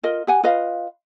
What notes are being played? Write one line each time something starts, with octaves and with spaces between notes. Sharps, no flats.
F4 A#4 D#5
G4 F#5 G#5
F4 B4 D#5 F5